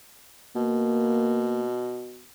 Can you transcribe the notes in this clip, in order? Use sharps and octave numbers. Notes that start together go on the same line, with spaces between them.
B2 A#3